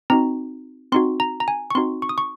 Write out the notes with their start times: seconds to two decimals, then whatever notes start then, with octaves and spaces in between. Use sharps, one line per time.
0.10 C4 D#4 F#4 A#5
0.92 C4 D#4 F#4 C6
1.20 A#5
1.40 A#5
1.48 G#5
1.71 C#6
1.75 C4 D#4 F#4 C6
2.02 C#6
2.09 D#6
2.18 C#6